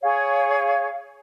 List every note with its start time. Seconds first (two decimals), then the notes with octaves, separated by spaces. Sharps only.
0.03 G#4 C#5 F5